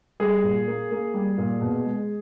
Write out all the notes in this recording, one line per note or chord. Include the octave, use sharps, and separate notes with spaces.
G3 G#4
A#2
A#3
A#3
G3
A#2
B2
G#3